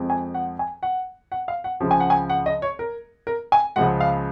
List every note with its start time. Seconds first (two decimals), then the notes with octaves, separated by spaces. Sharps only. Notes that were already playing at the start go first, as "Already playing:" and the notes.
Already playing: F2 F3 G#3
0.10 G#5
0.34 F#5
0.59 G#5
0.83 F#5
1.32 F#5
1.48 F5
1.64 F#5
1.80 C#2 C#3 F3
1.91 G#5
2.00 F#5
2.10 G#5
2.30 F#5
2.46 D#5
2.62 C#5
2.79 A#4
3.27 A#4
3.52 G#5
3.76 C#2 C#3 F3 G#3 F#5
4.00 F5